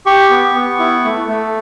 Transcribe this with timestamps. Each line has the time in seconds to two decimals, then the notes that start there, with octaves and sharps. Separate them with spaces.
0.06 G4 C#6
0.30 B3
0.55 B3
0.79 E4
1.05 A3
1.28 A3